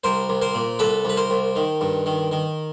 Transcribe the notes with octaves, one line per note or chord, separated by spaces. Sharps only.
C2 A#4 C5
C2
A#4 C5
A#2
C2 A4 B4
C2 B4
A#4 C5
C2
D#3
G2
D#3
D#3